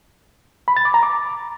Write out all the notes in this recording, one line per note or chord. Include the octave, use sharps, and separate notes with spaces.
B5
A6
D6
A#5
D6